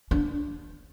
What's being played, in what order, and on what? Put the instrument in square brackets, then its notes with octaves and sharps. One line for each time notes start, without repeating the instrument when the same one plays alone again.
[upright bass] D4